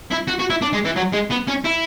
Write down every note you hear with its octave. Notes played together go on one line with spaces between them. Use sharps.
E4
F#4
F#4
E4
D4
G#3
E3
F#3
G#3
B3
C#4
E4